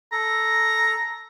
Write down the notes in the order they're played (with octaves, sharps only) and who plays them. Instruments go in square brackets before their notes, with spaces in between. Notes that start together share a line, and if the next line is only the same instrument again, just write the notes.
[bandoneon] A4 [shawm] A#5